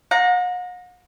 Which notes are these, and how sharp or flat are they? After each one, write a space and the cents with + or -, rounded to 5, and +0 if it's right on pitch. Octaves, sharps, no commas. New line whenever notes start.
F#5 -45 A#5 +0